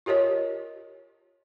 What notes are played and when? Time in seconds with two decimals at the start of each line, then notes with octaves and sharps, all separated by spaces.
0.06 F4 G4 A#4 C#5 D#5